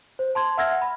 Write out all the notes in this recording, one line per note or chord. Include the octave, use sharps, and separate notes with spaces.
C5
A5 C6 G#6
E5 F#5 E6 F6 G#6 A#6
B5